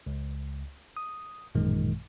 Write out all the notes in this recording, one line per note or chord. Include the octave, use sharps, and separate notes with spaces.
C#2
D#6
A1 F#2 A#2 D#3 G#3